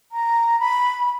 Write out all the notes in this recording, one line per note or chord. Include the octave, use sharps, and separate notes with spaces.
A#5
B5